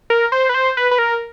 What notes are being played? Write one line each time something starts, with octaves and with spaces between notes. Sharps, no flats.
A#4
C5
B4
C5
B4
B4
A#4